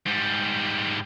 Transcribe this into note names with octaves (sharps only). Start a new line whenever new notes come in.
G#2 G3